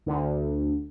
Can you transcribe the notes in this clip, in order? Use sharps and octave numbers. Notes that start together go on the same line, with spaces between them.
D2